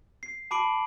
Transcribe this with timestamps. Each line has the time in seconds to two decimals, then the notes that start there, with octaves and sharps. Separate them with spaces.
0.23 C7
0.51 A5 B5 D6 C7 D7 F#7